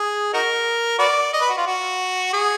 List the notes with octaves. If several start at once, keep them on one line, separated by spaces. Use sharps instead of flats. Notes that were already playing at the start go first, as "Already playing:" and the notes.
Already playing: G#4
D#4 F#4 A#4
F#4 B4 D5
D#5
B4
F#4
F4
F#4
G#4